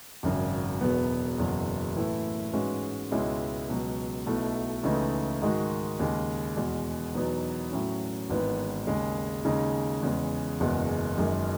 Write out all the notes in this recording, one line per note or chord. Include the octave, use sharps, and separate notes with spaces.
G#1 F#2 C#3
E1 E2 B2 F#3 B3
F#1 E2 B2 F#3
A2 E3 A3 E4
G#2 E3 G#3 C#4 F#4
C#2 B2 G#3 C#4 E4
C#2 B2 F#3
B1 B2 A3 E4
C#2 C#3 E3 A3 D#4
G#2 D#3 G#3 D#4 F#4
D#2 C#3 G#3
E2 B2 G#3
E2 B2 F#3 B3 D#4
A2 F#3 C#4
G#1 G#2 E3 B3 D#4
D#2 C#3 G#3
D#2 C#3 G#3 D#4
E2 C#3 G#3
F#1 E2 B2 G#3
F#1 F#2 D#3 G#3